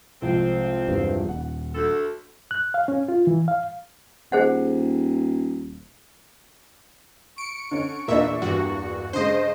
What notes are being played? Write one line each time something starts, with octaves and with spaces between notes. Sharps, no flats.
C2 F2 F3 G#3 C4
E2 G2
D#1 F#5
D2 A4
F#6
F5
C#4
F4
E3
F5
D#1 G#4 C5 F#5
C#6 C#7 D7
D3 C#4
E2 A#2 A#3 D4 E5
E2 G2 F#4
G2 C#3 G#3 C5 D#5